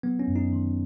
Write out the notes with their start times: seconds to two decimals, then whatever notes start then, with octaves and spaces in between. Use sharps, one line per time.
0.03 F#3 B3
0.19 C#4
0.27 F#2
0.36 D#4
0.53 D#3